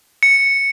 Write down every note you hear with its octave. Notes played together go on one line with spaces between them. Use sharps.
C#7